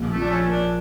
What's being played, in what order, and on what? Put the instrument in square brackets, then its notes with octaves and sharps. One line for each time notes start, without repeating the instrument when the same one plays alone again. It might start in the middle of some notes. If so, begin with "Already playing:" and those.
Already playing: [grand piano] A#1
[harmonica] A3
[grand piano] F3 [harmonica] D4
[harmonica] A3 C#4
[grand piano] A#3
[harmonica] D4